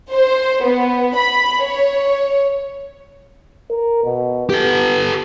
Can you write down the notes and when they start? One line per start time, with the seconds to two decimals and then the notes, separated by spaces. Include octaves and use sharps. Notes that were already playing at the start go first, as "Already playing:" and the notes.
0.12 C5
0.64 B3
1.16 B5
1.65 C#5
3.71 A#4
4.04 B2
4.50 B3 G4 A4